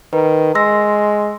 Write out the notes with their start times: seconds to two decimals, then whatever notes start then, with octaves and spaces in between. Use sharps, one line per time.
0.13 D#3 B4
0.55 G#3 C6 E6 A#6